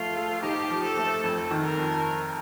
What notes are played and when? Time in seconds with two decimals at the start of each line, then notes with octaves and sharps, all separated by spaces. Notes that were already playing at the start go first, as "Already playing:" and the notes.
Already playing: F3 A3 F4
0.17 A4
0.42 D#4 G4
0.70 F3
0.83 A4
0.97 A3
1.24 F2
1.51 D#3
1.64 A#4
1.78 F2